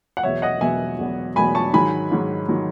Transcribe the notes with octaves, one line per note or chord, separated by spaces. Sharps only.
F#5
E2 B2 F#3 B3 C#5 E5
D#5 F#5
E2 B2 F#3 B3 E5 G#5
E2 B2 F#3 B3
E2 B2 F#3 B3 G#5 B5
A5 C#6
G#2 D#3 F#3 G#5 B5
G#2 D#3 F#3
D#3 F#3